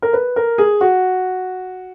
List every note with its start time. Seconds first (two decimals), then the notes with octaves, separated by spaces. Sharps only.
0.02 A#4
0.13 B4
0.36 A#4
0.58 G#4
0.81 F#4